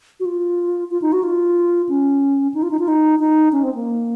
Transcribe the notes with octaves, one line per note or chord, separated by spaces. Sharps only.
F#4
F4
F4
D#4
F#4
F4
C#4
D#4
F4
D#4
F4
D#4
D#4
C#4
C4
A#3